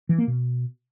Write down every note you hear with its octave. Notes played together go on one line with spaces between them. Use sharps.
E3
A#3
B2